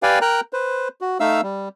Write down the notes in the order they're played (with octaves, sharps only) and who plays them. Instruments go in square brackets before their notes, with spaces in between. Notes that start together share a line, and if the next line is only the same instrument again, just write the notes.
[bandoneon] G4 B4 D5 F5 G5 G#5
A#4 G5 A#5 F#6
B4 C5
F#4
A3 D#4 E5 F5 E6
G3